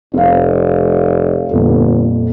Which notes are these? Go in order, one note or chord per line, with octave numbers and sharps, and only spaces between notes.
F1 C4 F5
G1 F2 A#2